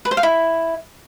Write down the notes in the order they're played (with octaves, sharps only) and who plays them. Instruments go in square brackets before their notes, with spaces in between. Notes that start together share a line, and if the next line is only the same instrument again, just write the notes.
[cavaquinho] B4
C5
F5
E4